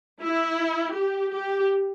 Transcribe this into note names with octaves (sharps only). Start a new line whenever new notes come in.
E4
G4
G4